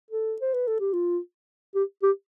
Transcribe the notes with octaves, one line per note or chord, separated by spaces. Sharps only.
A4
C5
B4
A4
G4
F4
G4
G4